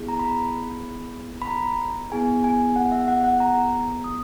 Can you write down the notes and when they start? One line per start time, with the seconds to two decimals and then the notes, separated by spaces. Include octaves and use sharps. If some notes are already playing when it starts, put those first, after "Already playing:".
Already playing: B3 E4 G#4
0.08 A#5
0.20 B5
1.42 B5
1.47 A#5
2.12 B3 E4 G#4 G#5
2.44 G#5
2.76 F#5
2.92 E5
3.08 F#5
3.24 F#5
3.40 A#5
4.04 D#6